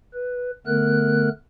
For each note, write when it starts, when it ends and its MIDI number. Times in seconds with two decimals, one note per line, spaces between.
0.14 0.51 71
0.67 1.29 50
0.67 1.29 57
0.67 1.29 59
0.67 1.29 70
0.67 1.29 90